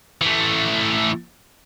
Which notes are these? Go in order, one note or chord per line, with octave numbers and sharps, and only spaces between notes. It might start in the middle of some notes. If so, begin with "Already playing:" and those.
E3 A3